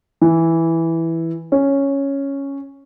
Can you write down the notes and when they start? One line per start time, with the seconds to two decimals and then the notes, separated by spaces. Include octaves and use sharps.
0.21 E3
1.52 C#4